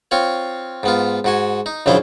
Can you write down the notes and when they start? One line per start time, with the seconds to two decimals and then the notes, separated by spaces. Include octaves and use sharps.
0.11 C4 F4 C#5
0.83 G#2 B3 F4
1.24 G#2 F#4 G#5
1.66 D#4
1.86 A#1 F#2 C#3 F3 E4 C5